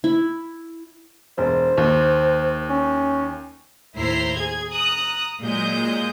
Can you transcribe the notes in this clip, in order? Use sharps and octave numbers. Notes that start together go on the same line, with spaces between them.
E4
E1 C5
D#2
C#4
D#2 A2 E4 C5 A#5 C7
G#4 G#6
A#5 D#6 F#6
A#2 F#3 G#3 D#5 G6